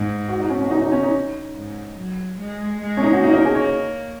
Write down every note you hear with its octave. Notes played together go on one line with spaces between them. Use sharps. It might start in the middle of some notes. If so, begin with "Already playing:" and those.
Already playing: G#2
F#4
D#4
C#4
C#4
F#4
D#4
D#4
C#4
D#4
G#2
F#3
G#3
G#3
C#4
D#4
F#4
A#3 D#4
D#4
G#4
C#5